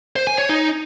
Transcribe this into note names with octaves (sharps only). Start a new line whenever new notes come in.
C5
G#5
C#5
D#4